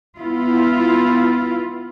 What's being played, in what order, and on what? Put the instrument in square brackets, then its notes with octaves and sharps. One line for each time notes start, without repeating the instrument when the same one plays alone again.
[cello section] B3 E4 F4